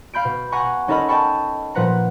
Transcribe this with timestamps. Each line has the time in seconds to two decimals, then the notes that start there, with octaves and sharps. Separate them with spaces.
0.14 F5 B5 G6 D7
0.25 B2
0.52 F#5 G#5 A#5 B5 C#6
0.88 C#4 D#4 A4 A#4 D#5 B5
1.09 D#5 G5 A5 B5 C#6
1.75 A#2 F3 B4 F#5 A#5